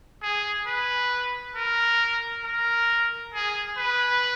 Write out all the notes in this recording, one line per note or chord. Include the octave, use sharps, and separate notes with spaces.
G#4
B4
A#4
A#4
G#4
B4